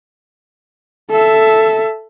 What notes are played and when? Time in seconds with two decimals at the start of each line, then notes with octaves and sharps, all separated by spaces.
1.10 A4 E5